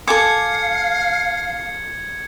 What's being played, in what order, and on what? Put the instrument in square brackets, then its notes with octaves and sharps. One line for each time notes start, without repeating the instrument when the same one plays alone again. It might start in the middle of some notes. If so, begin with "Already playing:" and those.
[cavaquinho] A4 G#5 D6 [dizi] F5 [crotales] G#6 C#7